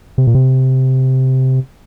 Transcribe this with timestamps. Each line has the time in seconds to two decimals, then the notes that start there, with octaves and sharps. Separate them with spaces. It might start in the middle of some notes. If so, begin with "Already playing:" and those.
0.18 C3
0.27 A#2
0.35 C3